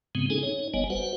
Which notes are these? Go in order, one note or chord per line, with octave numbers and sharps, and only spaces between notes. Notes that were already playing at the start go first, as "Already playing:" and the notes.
G#2 C#3 G#3 B3 C4
C4 C#4 D#4 G#4 A4 G#5
D#4 C#5
F#1 G3 B3 C#5 D#5 G#5
F#4 B4 C5 F#5